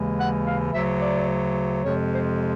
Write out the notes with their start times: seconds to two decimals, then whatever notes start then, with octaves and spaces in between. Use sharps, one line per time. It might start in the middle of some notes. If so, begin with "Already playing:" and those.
Already playing: D#2 C#3 E3 G#3
0.20 F#5
0.47 F5
0.73 D2 C#3 F#3 E5
1.01 D5
1.83 F2 C3 F3 G#3 C#5
2.11 C5